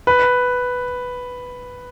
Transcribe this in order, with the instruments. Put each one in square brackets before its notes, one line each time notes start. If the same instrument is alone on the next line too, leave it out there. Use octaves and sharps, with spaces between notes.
[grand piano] B4